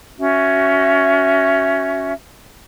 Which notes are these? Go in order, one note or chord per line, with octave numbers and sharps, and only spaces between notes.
C#4 F#4 E5